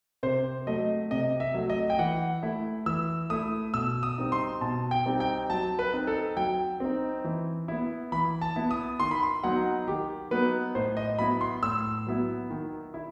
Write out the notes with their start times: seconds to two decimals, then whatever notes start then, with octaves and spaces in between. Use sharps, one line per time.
0.23 C3 C5
0.67 F#3 A3 D#5
1.11 C3 D#5
1.40 E5
1.55 F#3 A3
1.70 D#5
1.90 G5
1.99 E3 F#5
2.43 A3 E4
2.86 E3 E6
3.30 A3 E4 D#6
3.74 B2 E6
4.03 D#6
4.18 G3 C4 D#4
4.32 C6
4.61 B2 A5
4.91 G5
5.05 G3 C4 D#4
5.20 G5
5.49 F#3 A5
5.79 B4
5.93 C4 D#4
6.07 A4
6.37 F#3 G5
6.80 C4 D#4
7.24 E3
7.68 B3 E4
8.12 E3 B5
8.41 A5
8.56 B3 E4
8.71 D#6
9.00 D#3 C6
9.11 B5
9.23 C6
9.44 F#3 B3 D#4 F#5
9.87 D#3 G4
10.31 F#3 B3 D#4 B4
10.75 A2 C5
10.97 D#5
11.19 F#3 B3 E4 B5
11.41 C6
11.63 A2 E6
12.07 F#3 B3 E4
12.50 D#3
12.94 E4